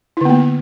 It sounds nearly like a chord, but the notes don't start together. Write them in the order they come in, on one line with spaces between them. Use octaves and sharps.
E4 D3 B3 A#3